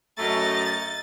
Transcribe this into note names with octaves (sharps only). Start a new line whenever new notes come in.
F#2 A3 D#5 A#5 A6